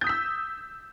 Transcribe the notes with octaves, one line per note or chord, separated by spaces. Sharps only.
D#6 E6 G6 B6